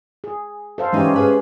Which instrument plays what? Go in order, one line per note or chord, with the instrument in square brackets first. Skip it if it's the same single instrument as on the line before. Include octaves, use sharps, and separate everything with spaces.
[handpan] G#4
A4 C5 F5
[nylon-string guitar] E3 D#4 [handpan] G#3 G4 [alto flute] C#4
[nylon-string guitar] G#4 B4 F5